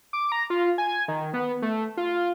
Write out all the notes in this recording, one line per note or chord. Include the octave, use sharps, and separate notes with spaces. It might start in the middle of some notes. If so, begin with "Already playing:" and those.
D6
A#5
F4
G#5
D#3
B3
A3
F4